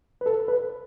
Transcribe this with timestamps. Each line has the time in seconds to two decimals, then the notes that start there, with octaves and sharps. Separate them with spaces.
0.21 B4
0.26 A4
0.48 B4